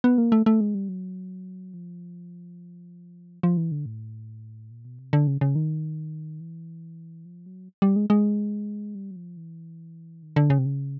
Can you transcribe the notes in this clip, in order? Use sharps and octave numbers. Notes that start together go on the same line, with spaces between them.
B3
A#3
A3
A3
G#3
G3
F#3
F3
F3
E3
D3
A2
A#2
B2
C3
D3
C#3
C#3
D#3
E3
F3
F#3
G3
G#3
G#3
G3
F#3
F3
E3
D#3
D3
C#3
C3
C#3